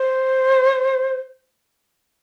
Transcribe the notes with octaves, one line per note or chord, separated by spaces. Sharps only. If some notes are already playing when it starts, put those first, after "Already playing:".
Already playing: C5